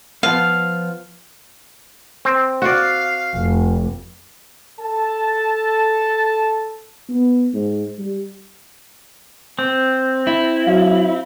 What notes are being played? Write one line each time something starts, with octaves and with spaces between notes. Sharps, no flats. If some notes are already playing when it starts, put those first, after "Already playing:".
F3 B3 F5
C4
F#4 D5 F5
F1
A4 A5
B3
G#2
G3
C4
E4
F#3 F5